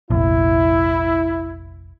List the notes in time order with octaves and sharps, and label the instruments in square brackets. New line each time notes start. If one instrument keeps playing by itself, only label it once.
[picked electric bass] F1 A#1 [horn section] E4